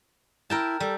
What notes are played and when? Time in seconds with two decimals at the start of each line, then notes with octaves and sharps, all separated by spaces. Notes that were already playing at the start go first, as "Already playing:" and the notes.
0.50 E4 A#4 G5 A5
0.80 G3 A4